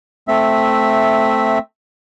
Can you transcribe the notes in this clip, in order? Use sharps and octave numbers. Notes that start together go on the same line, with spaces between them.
A3 C4 E5